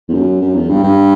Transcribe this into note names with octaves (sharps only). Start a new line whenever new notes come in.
E2
F#2
F#2
E2
G2
G2